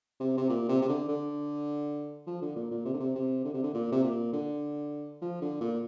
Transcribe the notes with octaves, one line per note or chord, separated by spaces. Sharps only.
C3
C3
A#2
C3
C3
D3
D3
F3
D3
A#2
A#2
C3
D3
C3
C3
D3
C3
D3
A#2
C3
A#2
D3
F3
D3
A#2